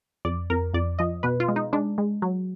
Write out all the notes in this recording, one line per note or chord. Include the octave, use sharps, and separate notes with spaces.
F2 D5
F2 A#4
F2 D5
F3 D#5
B2 B4
F4
G#3
D#4
G#3 D4
G#3
F#3